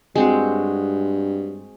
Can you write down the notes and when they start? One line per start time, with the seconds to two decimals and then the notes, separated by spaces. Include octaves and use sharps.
0.15 G2 G#3 C4 F#4